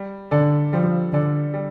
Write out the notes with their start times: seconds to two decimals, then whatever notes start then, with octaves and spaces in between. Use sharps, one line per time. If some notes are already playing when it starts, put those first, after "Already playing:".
Already playing: G3
0.31 D3 D4 A4 D5
0.73 F3 G3
1.12 D3 D4 A4 D5
1.54 G3